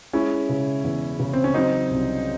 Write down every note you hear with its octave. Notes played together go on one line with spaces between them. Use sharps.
G#3 C#4 E4
C#3
E2
C#3
C4
C#4
F#3 C4 D#4
C2